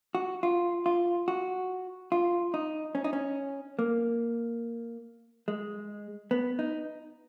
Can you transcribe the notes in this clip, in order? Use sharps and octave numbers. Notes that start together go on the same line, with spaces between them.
F#4
F4
F4
F#4
F4
D#4
C#4
D#4
C#4
A#3
G#3
B3
D#4